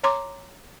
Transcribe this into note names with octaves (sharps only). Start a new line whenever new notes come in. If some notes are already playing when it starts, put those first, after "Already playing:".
C#5 A#5 C6 D6